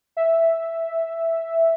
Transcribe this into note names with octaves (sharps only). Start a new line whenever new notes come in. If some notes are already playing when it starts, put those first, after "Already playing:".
E5